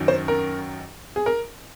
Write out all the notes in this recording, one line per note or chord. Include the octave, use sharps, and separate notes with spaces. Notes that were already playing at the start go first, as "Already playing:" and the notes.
Already playing: F#2 D#3 F#3
C5
A#4
G#4
A#4